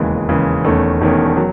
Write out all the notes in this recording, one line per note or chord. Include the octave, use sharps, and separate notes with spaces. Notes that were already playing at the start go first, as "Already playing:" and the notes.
Already playing: E1 D#2 C#3 E3 G#3
E1 D#2 C#3 E3 G#3
E1 E2 D#3 A3 C#4
E1 E2 D#3 A3 C#4
F#3